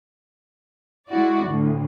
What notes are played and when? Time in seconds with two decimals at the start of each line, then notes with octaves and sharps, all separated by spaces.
1.08 G#3 E4 F#4 D5
1.46 D2 A2